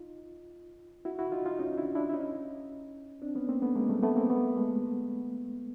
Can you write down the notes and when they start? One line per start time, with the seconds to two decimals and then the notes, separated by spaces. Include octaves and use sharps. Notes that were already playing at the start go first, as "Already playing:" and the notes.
Already playing: D#4 F4
1.05 E4 F#4
1.19 E4 F#4
1.32 D#4 F4
1.46 D#4 F4
1.59 C#4 D#4
1.77 D4 E4
1.95 D4 E4
2.09 E4
2.13 C#4 D#4
3.22 C4 D4
3.35 B3 C#4
3.49 A#3 C4
3.62 A3 B3
3.75 G#3 A#3
3.89 G3 A3
4.03 A3 B3
4.16 A#3 C4
4.30 A3 B3
4.57 G#3 A#3